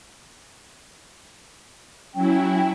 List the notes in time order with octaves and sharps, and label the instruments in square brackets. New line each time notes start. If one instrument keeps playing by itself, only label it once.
[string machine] F#3 E4 [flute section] C#4 G5